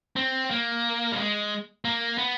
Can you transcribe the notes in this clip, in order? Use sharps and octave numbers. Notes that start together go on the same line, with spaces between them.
C4
A#3
G3
G#3
A#3
B3